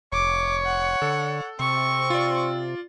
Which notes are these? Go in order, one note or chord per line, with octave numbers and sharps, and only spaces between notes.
F1 C#5 D6
F#5
D3 A4
C3 C4 C#6
F4 D5